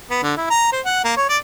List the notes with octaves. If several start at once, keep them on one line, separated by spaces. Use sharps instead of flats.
B3
D3
E4
A#5
C5
F#5
A#3
C#5
D5